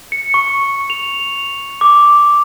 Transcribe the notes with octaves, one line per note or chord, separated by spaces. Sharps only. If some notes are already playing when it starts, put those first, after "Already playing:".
C#7
C#6
F7
D6